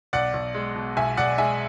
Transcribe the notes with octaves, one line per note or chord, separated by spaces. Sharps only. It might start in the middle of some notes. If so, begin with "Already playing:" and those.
B1 D5 F#5
B1
G#3
B2
B1 E5 G#5
B1 D5 F#5
G#3 E5 G#5